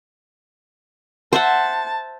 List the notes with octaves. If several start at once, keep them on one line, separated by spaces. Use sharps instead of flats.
C5 E5 F#5 A5